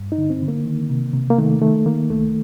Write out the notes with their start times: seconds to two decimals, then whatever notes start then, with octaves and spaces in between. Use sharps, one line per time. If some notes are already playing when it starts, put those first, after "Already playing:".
Already playing: G2
0.12 D#4
0.18 D3
0.30 C4
0.42 D3
0.48 A#3
0.66 D#3
0.90 C3
1.14 C3
1.30 A#3
1.38 D#3 A3
1.61 D#3 A3
1.86 D#3 A#3
2.10 C2 A3